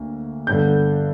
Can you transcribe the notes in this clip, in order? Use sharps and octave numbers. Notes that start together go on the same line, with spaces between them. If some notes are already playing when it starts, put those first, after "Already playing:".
Already playing: D2 A#3
G1 G2 D3 G6